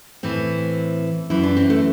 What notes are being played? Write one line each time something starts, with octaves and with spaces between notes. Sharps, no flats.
A2 E3 C4
F#2 E3 E4
D4
C4
A3